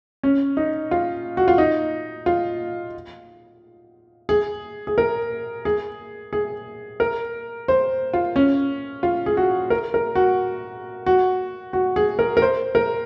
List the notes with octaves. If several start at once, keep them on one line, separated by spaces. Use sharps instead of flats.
C#4
D#4
F4
F#4
F4
D#4
F4
G#4
G#4
A#4
G#4
G#4
A#4
C5
F4
C#4
F4
G#4
F#4
A#4
A#4
F#4
F#4
F#4
G#4
A#4
A#4
C5
A#4